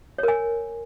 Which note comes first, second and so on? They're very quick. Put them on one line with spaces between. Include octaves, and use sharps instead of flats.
C#5 A#4 G#5